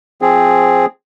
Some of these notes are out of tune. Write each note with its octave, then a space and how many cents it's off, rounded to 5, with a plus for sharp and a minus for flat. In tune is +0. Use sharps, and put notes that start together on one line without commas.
F3 +0 C4 +0 G#4 +0